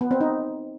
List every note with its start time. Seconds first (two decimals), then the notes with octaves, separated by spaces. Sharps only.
0.01 B3
0.11 C4
0.21 D#4